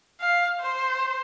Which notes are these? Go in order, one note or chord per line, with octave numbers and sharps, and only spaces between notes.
F5
C5